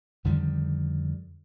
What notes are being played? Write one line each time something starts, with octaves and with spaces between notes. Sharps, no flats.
F2 D3 D#3 G3